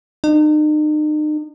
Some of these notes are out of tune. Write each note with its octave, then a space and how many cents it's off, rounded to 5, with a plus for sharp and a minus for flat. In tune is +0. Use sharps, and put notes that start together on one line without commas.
D#4 -40